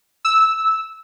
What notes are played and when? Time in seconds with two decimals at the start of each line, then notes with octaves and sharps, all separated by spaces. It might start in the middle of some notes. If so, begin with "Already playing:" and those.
0.25 E6